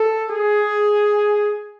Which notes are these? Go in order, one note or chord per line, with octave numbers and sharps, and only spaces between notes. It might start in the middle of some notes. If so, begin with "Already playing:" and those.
Already playing: A4
G#4